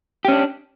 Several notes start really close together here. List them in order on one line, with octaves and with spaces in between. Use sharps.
G4 C#4 D4